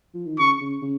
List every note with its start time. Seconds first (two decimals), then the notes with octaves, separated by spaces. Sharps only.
0.14 F3
0.26 D#3
0.39 C#3 C#6
0.61 C#3
0.82 C#3